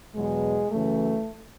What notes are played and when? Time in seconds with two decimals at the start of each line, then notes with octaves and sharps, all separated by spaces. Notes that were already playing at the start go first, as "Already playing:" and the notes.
0.15 E2 B2 F#3 G#3
0.71 F#2 C#3 E3 A3